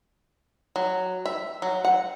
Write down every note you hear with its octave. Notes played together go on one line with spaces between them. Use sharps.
F#3
E5
F#3
F#5